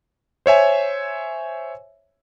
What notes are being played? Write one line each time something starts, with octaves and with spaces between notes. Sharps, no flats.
C5 C#5 E5 G#5